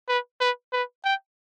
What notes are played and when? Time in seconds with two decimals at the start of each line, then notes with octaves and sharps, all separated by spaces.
0.08 B4
0.40 B4
0.73 B4
1.04 G5